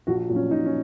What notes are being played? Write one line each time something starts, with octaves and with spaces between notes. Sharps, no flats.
A#1 F#4
A#2 F#3
C#4
A#1 D#4
C#4